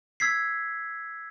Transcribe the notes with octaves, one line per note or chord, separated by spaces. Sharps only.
E6 G#6 B6 C7